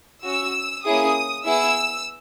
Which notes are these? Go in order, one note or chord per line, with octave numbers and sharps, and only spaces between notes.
C#4 F#4 E6
A#3 C#4 E4 G#4 D#6
B3 E4 G#4 E6